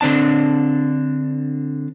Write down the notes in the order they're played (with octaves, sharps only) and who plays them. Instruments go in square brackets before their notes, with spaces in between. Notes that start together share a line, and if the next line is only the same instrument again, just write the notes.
[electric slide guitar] D3 C4 D4 A5